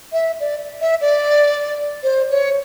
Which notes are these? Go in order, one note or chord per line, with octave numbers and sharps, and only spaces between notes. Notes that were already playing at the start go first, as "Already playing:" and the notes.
E5
D5
E5
D5
C5
C#5